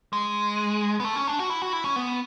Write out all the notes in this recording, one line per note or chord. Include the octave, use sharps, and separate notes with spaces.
G#3
B3
A3
C#4
D4
F#4
E4
F#4
E4
C#4
B3